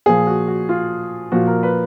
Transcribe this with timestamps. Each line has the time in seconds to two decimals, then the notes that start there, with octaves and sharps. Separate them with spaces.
0.06 A#2 F3 G#4
0.27 F#4
0.48 F#4
0.69 F4
1.32 A#2 F3 F#4
1.48 A#4
1.63 B4